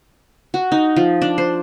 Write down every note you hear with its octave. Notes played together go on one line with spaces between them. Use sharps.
F#4
D#4
F3
D4
C5